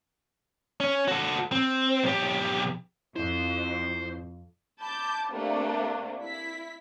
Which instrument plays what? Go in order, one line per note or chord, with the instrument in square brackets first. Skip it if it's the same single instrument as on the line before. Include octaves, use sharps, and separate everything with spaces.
[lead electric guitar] C#4
F#4 A4
C4
B1 G4
[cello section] F2 [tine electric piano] E4 [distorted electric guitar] C5
[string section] A5 B5 D6 G6
C3 A3 A#3 D4
E4 B6